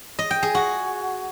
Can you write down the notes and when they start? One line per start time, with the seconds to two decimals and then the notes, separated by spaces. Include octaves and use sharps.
0.19 D#5
0.31 G5
0.43 G#4
0.55 F#4